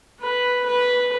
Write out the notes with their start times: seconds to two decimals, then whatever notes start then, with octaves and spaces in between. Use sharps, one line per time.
0.20 B4
0.66 B4